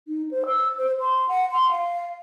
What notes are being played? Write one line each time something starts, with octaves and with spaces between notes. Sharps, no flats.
D#4
C5
E6
C5
C6
F#5
C6
F5